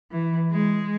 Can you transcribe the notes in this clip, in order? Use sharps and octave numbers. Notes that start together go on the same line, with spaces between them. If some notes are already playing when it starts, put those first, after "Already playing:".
E3
G#3